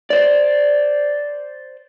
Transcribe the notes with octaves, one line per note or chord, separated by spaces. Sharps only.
C5 D5